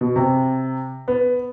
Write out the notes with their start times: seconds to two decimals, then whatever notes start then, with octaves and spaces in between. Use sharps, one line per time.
0.01 B2
0.16 C3
1.08 B3